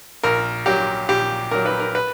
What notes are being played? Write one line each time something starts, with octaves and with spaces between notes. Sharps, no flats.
A#1 A#4
A#2 F#3 G4
A#1 G4
A#2 F#3 A#4
B4
A#4
B4